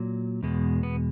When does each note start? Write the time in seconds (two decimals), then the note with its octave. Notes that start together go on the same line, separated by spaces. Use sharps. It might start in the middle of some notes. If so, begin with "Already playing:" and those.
Already playing: A#2 F#3
0.43 E2 B2 G#3
0.83 B3